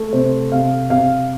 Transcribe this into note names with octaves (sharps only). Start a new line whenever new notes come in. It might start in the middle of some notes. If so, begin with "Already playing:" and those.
Already playing: A3
C3 C5
C3 F5
C3 F5